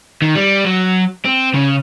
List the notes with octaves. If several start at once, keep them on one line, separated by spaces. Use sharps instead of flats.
D#3
G3
F#3
C4
C#3